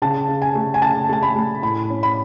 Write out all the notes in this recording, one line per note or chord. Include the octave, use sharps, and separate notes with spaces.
C#3 A5
C#3
G#5
A3
G#5
C#3 A5
A3 A5
B5
A3
A2 B5
C#4
B5